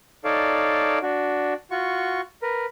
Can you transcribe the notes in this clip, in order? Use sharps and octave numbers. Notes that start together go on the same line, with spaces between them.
D#4 A4 C#5 D5 F5
D4 F#4
F4 F#4 C#6
A#4 B4